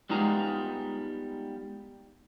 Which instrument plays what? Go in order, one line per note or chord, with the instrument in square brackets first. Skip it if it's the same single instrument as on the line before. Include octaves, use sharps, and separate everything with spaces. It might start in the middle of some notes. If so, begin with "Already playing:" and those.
[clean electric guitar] G3 G#3 B3 D#4 F4 A#5